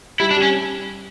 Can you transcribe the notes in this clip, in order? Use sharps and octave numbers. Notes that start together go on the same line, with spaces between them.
G3 E4
D4
G3
C#4